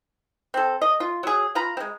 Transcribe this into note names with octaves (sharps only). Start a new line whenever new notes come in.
C4 A4
D#5
F4
F#3 G#4
F4 B4 A#5 B5
G#3 C4